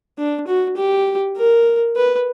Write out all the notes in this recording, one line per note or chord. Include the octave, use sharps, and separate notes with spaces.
D4
F#4
G4
A#4
B4